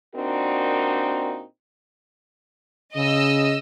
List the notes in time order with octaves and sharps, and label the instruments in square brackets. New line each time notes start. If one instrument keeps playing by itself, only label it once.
[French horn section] A#2 C4 D4 D#4 F#4 A#4
[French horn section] C#3 [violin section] D#5 E6